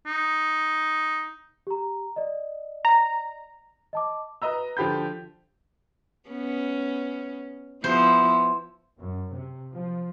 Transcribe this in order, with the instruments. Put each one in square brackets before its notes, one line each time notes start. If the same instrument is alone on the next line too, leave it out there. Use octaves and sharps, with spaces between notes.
[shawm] D#4
[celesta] G4 A#5
D5 D#5
[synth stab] A#5
[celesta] D#5 A5 D6
[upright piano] B4 D#5 A#5 E6
D3 F3 G4 B5 G6
[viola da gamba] B3 C#4
[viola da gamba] F3 B3 E4 [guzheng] C5
[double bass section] F#2
C3
F3